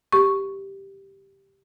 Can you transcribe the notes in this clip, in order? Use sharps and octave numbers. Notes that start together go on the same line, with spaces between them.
G4 C#6